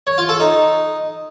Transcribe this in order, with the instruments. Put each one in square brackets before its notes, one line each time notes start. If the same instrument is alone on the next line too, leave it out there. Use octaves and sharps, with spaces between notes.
[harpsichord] C#5
F4
A4
D#4